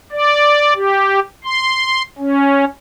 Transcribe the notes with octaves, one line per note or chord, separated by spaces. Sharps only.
D5
G4
C6
C#4